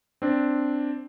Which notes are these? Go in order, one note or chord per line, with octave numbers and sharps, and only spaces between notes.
C4 D4